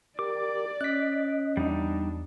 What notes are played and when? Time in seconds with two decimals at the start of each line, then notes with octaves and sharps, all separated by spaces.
0.19 G4 A#4 D5 D6
0.81 C#4 D#5 F#6 B6
1.57 E2 G3 D4 D#4